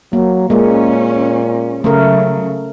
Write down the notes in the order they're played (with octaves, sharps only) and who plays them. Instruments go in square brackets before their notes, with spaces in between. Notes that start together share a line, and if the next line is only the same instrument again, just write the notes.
[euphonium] F#3 [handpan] A#3
[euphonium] A#2 [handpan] G#3 A#3 [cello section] C#4
[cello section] C#3 F#3 [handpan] A3 A#4